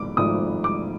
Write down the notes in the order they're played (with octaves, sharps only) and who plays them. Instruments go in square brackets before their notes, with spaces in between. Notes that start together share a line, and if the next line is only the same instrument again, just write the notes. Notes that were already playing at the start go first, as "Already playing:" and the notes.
Already playing: [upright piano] G#2 F3 A3 D6
G#1 G#2 F3 A3 D#6
D6